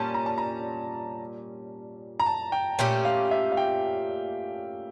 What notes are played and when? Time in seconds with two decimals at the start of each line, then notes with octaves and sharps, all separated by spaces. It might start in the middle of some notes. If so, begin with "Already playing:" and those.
Already playing: A#2 G3 C#4 A5
0.14 A#5
0.26 A5
0.38 A#5
2.20 A#5
2.26 A5
2.52 G5
2.79 A#2 A3 C#4 G4 G5
3.05 F5
3.31 E5
3.52 F5
3.57 G5